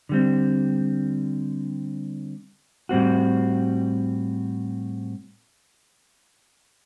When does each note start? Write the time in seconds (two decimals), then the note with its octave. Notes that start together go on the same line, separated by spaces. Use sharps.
0.09 D3 G3 C4
2.89 A2 G3 C4 F#4